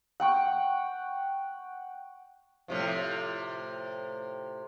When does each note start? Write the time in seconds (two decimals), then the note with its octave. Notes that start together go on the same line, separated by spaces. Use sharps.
0.20 F#5 G5 C#6
2.68 A2 C3 F3